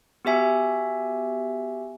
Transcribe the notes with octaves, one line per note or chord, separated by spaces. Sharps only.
B3 F#4 G4 E5 G#5